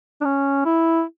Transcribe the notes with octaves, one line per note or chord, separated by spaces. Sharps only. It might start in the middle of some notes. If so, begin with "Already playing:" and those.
D4
C#4
E4